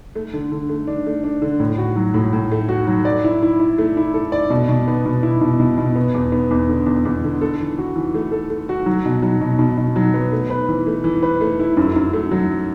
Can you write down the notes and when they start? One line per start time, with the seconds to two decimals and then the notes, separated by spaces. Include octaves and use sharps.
0.16 A3
0.33 D3
0.52 D3
0.69 A3
0.88 D4
1.06 A3
1.24 D4
1.42 D3
1.60 A2
1.78 F#4
1.96 F#3
2.14 A2
2.33 A2
2.52 A3
2.69 F#4
2.87 F#3
3.05 D5
3.24 E4
3.42 E4
3.59 E4
3.78 A3
3.97 E4
4.14 A4
4.32 D5
4.50 B2
4.69 B2
4.87 B3
5.06 B2
5.23 E4
5.41 B2
5.60 B2
5.78 B2
5.96 B3
6.14 E2
6.32 B3
6.51 E2
6.69 D3
6.86 E2
7.05 E2
7.24 D3
7.41 A4
7.60 E3
7.78 F#4
7.96 E3
8.15 A3
8.32 A4
8.50 A3
8.69 F#4
8.86 F#3
9.05 B2
9.22 F#3
9.41 B2
9.59 B2
9.78 B2
9.96 F#3
10.14 B3
10.32 A3
10.50 B4
10.68 E3
10.87 A3
11.04 E3
11.23 B4
11.41 A3
11.60 E4
11.77 F#2
11.96 F#2
12.13 A3
12.31 F#3